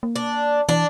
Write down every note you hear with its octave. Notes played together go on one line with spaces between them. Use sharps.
A#3
D4
E3 D4